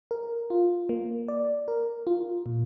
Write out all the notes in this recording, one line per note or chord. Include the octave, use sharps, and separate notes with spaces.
A#4
F4
A#3
D5
A#4
F4
A#2